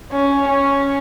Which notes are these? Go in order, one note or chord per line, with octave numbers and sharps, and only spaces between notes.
C#4
C#4